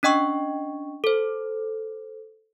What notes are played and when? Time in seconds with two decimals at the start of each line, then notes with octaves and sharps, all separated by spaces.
0.03 C#4 D4 D#5 G5 C#6
1.04 A4 C5